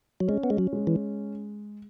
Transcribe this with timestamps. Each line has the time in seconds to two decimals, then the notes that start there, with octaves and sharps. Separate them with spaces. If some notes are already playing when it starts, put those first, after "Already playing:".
0.20 F#3
0.28 G#3 C#4
0.43 B3
0.50 G#3
0.58 F#3
0.73 G#3
0.87 E3